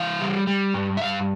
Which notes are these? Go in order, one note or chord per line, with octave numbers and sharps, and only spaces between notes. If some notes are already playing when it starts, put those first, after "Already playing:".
Already playing: E3 F5
G3
G3
G2
E5
G2 F5